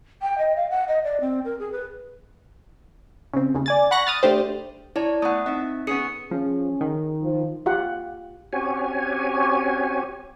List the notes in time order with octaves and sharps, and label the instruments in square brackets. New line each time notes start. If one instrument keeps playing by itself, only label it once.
[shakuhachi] G5
D#5
F5
F#5
D#5
D5
C4
A#4
G#4
B4
[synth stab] C#3 C4
D#2 C#3
D5 G#5 A6
F#5 B5 C#6 F#6 A#6
D#6 F6 A6
A3 D4 G4 C5
[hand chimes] E4 D5 A5 [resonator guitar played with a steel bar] C#5
[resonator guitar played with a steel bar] A3 B3 [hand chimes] F#5 D#6
[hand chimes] C4 D#4 [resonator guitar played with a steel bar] E5
[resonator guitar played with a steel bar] B3 C#4 G#4 [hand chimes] C#7
[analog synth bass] F3 [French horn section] C#4 G#4
[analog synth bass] D#3
[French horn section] F3
[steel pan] F4 G4 F5 F#5
[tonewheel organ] C4 C#4 F#4 G4 C#5 G#5